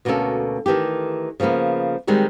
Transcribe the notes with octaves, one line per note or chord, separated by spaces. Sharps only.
D2 B2 A#3 C4 C#4 A4
D#3 E3 A3 G4
C#3 F3 G3 A#3 B3
D#3 G3 G#3 C4 F#4